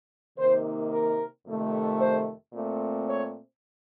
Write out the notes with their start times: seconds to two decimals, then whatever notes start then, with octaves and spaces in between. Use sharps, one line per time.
0.38 C3 D#3 A#3 D#4 C5
0.91 A#4
1.46 F2 C3 D#3 A3
2.00 C5
2.54 A#2 A3 C4
3.08 C#5